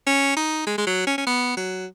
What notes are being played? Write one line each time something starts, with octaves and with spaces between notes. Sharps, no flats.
C#4
D#4
G#3
G#3
F#3
C#4
C#4
B3
F#3